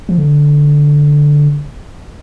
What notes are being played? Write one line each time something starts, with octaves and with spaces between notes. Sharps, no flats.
F3
D3